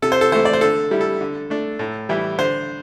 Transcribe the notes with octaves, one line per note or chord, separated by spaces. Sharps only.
C3 A4
C5
A4
E3 A3 C5
D5
C5
D3 A4
G3 E4
A4
D3
A3 D4
A2
E3 G3 E4
D3 C5